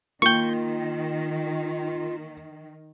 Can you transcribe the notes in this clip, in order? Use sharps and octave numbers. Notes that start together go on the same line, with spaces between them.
D#3 A#3 F4 G5 C#6 G6